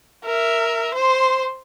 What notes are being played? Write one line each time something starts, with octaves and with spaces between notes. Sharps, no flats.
A#4 E5
C5 C6